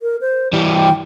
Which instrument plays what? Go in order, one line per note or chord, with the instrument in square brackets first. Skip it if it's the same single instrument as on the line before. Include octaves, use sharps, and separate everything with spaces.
[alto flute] A#4
C5
[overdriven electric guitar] E3 G3 [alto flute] G4
[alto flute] G5